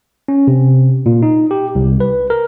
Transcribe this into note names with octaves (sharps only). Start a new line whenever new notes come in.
C#4
C3
A#2
D#4
G4
C2
B4
A#4